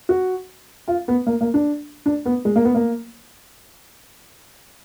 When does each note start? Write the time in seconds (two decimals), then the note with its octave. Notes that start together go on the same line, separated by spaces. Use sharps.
0.09 F#4
0.88 F4
1.08 B3
1.27 A#3
1.41 A#3
1.54 D4
2.06 D4
2.25 B3
2.45 G#3
2.56 A#3
2.65 B3
2.75 A#3